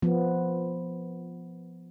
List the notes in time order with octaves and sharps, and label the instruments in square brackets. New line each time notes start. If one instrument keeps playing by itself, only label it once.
[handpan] F3 B3